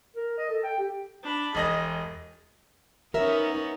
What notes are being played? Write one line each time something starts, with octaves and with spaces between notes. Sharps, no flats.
A#4
D#5
A4
G5
G4
D4 B5
E1 G#4 D#5 A#6
B3 C#4 D#4 A#4 E5